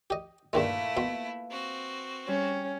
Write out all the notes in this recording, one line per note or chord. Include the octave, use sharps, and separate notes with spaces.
G4 D#5
G2 A#2 D#3 G#3 A3 E4 F5
B2 B4 C6
C4 F#4
G3 C#4